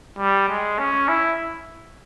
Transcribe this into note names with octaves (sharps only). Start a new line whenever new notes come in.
G3
G#3
C#4
E4